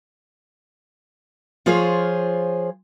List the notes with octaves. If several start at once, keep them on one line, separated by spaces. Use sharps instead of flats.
F3 F4 G#4 C5 C#5